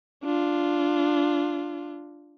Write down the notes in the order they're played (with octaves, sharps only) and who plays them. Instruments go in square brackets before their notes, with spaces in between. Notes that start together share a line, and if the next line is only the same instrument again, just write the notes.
[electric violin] D4 F4